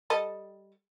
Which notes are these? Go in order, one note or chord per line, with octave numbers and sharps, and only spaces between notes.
G3 A4 D#5